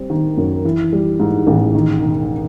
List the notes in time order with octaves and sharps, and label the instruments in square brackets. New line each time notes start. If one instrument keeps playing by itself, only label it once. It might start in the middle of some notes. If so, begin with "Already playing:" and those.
Already playing: [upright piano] G3 C4
D#3
F#2
E3
G3
G#2
A1
D#3
E1